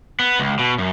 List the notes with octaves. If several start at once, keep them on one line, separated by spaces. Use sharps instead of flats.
B3
C#2
B2
F#2